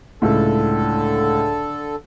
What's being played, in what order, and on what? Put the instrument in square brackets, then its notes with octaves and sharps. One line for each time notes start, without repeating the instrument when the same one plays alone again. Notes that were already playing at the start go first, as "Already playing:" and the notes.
[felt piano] C#2 A2 [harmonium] D3 A4